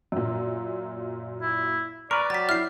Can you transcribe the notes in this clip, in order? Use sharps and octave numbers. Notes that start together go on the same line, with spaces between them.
F#2 A#2
E4
A#4 B4 D5 C#6
F#3 G4 A6 B6
E4 F6 C7